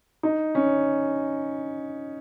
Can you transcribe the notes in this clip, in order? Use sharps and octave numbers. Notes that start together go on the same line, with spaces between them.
D#4
C#4